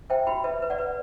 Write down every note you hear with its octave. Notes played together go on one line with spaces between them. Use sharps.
C5 E5 G5
F#4 G5 B5
B4 E5
B4
D5 F#5
B4